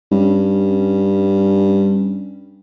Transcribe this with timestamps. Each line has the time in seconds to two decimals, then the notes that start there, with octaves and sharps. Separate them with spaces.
0.12 G2 C#4